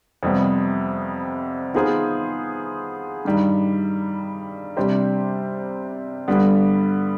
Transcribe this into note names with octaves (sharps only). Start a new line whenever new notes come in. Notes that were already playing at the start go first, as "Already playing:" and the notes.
F2 C3 G3 B3
D#3 B3 F4 G#4 C5
G2 D#3 G3
C3 G3 D4 G4 C5
G2 D3 G3 B3